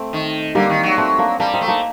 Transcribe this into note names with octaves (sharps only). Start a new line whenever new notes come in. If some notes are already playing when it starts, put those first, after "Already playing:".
Already playing: A3 C4
D#3
D3 G3 A#3
D#3
F#3
A3 C4
A#3 D4
G3 A#3 D4
C4 D#4
A3
A#3 D4